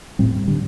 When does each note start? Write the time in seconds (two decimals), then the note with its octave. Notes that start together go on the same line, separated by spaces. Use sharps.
0.19 A2 G3 C4
0.47 D3 G3